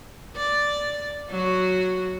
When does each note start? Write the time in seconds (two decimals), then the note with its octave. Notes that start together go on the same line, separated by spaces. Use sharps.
0.36 D5
1.30 F#3 F#4